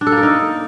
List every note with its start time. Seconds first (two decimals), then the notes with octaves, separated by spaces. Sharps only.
0.01 D4
0.07 A4
0.12 A#3
0.17 A#4
0.23 D#4